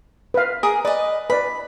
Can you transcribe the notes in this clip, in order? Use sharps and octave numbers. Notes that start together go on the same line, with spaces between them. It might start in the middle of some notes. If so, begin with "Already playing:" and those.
B4 F5
G#4 A#4 D#6
B4 D5 D#5
B4 D5 B5